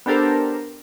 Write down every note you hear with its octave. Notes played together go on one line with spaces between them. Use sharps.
B3 D4 G4 A4 A#4 C5